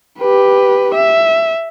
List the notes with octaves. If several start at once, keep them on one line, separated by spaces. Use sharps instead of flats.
G4 B4
E5